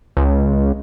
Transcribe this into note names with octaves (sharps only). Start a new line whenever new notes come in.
C#2